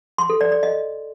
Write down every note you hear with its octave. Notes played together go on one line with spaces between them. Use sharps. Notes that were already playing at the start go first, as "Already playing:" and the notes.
C6
A4
D5
D5
D#5